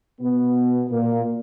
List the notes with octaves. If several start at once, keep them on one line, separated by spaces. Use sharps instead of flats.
B2 B3
A#2 A#3